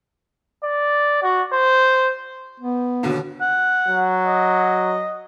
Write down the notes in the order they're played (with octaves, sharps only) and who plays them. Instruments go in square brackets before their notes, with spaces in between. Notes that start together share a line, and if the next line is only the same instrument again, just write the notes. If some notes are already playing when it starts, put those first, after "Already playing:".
[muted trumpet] D5
F#4
C5
[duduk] B3
[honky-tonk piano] D#2 B2 D3
[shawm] F#5
[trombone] F#3
[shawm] D#5